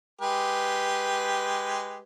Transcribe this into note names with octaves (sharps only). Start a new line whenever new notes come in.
G#3 G4 B4